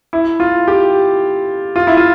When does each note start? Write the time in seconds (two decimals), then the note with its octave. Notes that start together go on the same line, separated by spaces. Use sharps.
0.13 E4
0.40 F4
0.68 G4
1.76 F4
1.87 E4
1.97 F4